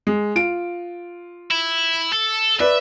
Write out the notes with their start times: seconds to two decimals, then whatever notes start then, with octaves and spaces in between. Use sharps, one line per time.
0.07 G#3
0.36 F4 D7
1.51 E4
2.13 A4
2.60 B4 D5 E5